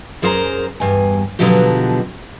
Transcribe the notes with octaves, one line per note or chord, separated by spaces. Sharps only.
F#2 G#4 A#4 C5 A5 A#5
E2 G2 G#5
B2 D3 F3 F#3 F#4 G4